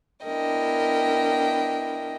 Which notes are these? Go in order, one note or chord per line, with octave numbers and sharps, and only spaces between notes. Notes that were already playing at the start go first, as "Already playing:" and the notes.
B3 D4 E4 A#4 D#5 G5